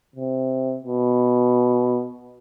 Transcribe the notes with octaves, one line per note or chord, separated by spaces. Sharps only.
C3
B2